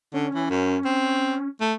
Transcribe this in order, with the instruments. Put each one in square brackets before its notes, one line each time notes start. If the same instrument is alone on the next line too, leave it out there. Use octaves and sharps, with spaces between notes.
[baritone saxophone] D3 [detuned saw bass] C#4
[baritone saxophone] E3
F#2
C4
A3